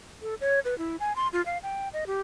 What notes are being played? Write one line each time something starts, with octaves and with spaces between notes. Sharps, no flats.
A4
C#5
B4
E4
G#5
C6
F4
F5
G5
D#5
G4